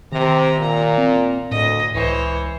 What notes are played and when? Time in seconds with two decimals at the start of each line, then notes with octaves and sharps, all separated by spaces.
0.12 C3 D#3 A#5
0.58 A#2
0.98 C4
1.51 D2 A2 D#5
1.94 C#2 E3 C5 C#5